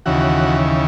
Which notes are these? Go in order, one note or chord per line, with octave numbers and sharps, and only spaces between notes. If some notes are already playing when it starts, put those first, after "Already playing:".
D#2 C#3 E3 F#4